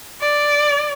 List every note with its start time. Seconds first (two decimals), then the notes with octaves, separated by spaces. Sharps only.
0.21 D5